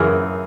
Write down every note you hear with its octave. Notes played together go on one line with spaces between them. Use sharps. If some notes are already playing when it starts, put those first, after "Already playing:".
Already playing: F#2 C#3 E3 G#4 A#4